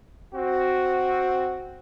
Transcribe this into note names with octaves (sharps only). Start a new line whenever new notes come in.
C4 F#4